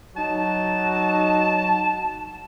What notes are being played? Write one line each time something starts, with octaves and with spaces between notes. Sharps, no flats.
F#3 D#4 F#4 A5